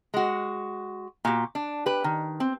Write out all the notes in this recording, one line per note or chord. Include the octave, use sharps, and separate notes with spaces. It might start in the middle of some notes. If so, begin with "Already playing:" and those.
G#3 F#4
A#2 F#4 G4
D4
G4 B4
D#3
C4